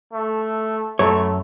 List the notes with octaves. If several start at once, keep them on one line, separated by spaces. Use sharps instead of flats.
A3
F#2 A3 C#5